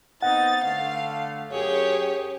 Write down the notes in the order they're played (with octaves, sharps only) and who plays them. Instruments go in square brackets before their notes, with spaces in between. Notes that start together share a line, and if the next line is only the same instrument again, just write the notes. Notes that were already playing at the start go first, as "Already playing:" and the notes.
[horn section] B3 C4 D#4 [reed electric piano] F#5 [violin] A6
[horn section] D3 A3 [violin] F5
[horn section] F#2 G#4 [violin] G4 C#5